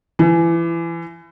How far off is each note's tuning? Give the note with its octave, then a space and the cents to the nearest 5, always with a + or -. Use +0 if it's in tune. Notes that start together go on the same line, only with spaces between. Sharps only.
E3 +30